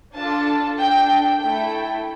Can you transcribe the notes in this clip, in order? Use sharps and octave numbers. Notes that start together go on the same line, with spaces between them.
D4 F4 A4 A5
D4 A4 G5
A3 E4 A4 G5